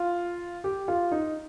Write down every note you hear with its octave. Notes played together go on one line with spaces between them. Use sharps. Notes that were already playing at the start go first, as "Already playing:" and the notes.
Already playing: F4
G4
F4
D#4